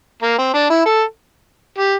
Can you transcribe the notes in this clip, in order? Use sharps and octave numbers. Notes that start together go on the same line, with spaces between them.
A#3
C4
D4
E4
A4
G4